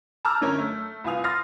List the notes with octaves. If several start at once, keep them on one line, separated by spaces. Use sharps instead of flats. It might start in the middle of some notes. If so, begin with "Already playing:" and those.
A5 A#5 D6 E6 F6 G6
F#2 D3 C#4 A#4 C#5
A3
C2 F4 B4 G#5 D#6 F7
C6 D#6 F6 A6 A#6 C7